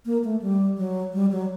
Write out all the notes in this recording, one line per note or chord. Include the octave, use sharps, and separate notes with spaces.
A#3
A3
G3
F#3
G3
F#3